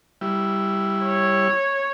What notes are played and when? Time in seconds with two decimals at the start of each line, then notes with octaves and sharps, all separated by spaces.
0.21 G3 E4
1.05 C#5